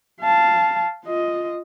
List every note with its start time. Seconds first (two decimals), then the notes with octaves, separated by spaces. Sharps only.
0.21 F5 A5
1.06 F4 D#5